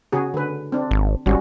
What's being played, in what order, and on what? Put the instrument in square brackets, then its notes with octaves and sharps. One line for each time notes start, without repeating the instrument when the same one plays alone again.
[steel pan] C#3 F#4 G#4
D3 B4
C4 D4
[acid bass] G#1
[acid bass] G#1 [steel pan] G3 C#4 F#4